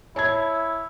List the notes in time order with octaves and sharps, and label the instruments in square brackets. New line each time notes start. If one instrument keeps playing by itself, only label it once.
[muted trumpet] E4 [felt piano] C#5 A5 G#6